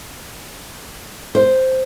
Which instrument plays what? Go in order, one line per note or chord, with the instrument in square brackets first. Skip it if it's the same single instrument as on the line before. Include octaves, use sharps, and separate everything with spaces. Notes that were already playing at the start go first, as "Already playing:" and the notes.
[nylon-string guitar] C5